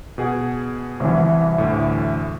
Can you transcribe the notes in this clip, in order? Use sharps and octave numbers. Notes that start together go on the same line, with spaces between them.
B2 G#4 F#5
C2 E3
D2 A2